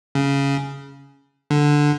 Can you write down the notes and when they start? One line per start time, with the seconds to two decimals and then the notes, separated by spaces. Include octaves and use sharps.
0.15 C#3
1.50 D3